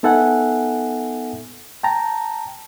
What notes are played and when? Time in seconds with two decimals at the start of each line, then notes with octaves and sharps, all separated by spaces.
0.03 B3 D#4 A4 E5 F#5 G#5
1.83 G5 A5 A#5